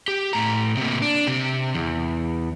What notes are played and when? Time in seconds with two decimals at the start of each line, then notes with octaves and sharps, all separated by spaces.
0.08 G4
0.33 A2 A#5
0.77 C3 A#3
1.02 D4
1.27 C3 G4
1.75 E2